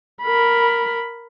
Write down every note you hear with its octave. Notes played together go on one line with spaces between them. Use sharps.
A#4 B5